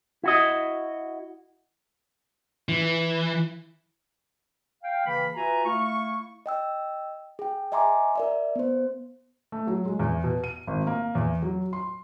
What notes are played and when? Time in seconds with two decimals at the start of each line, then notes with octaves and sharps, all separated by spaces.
0.24 E4 F#4 D#5
2.69 E3
4.84 F5 G5
5.06 C#3 E3 A#3 B4 F5 B5
5.35 F4 F#4 B4 E5 G#5 A#5
5.65 A3 E4 F5 C#6
6.46 D#5 G5 E6
7.39 G#4 G5
7.72 D#5 E5 G#5 A#5 C6 D6
8.15 A#4 D5 E5
8.56 B3 C5
9.52 A3
9.67 F#3
9.85 G#3
9.99 E2
10.24 B2
10.44 D#7
10.67 G#1
10.87 A#3
11.15 E2
11.42 F#3
11.73 C6